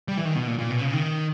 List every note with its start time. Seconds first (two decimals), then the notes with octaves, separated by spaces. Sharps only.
0.08 G3
0.17 E3
0.25 D#3
0.36 B2
0.47 A#2
0.59 A#2
0.70 B2
0.81 C#3
0.93 D#3